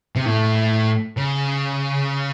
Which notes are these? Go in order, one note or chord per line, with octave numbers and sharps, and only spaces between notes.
C3
A2
C#3